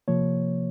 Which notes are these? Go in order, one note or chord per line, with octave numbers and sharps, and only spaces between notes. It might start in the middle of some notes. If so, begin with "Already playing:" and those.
C3 F3 A#3 C#5